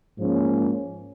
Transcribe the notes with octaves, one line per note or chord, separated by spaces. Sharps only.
G#2 F3 A#3 C#4